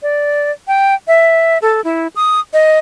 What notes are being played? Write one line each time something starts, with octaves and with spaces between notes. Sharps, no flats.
D5
G5
E5
A4
E4
D#6
D#5